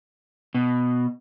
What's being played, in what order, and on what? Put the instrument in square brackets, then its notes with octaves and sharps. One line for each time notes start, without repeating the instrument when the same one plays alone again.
[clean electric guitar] B2